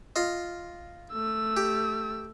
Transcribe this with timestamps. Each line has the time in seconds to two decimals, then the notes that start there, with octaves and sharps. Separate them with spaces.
0.16 F4 D#5
1.13 A3 E6
1.57 G4